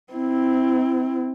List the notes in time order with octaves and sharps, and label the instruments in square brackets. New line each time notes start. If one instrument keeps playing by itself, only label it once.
[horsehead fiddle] C4 E4